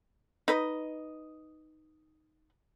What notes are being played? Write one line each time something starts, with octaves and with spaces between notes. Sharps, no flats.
D#4 B4 D#5